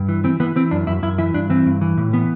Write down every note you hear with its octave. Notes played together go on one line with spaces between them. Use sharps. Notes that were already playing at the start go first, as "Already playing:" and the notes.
Already playing: G2
E3
E3 C4
E3 B3
E3 C4
F#2 D4
F#2 E4
F#2 E4
E3 E4
G2 D4
E3 C4
G2
E3
A2
E3 B3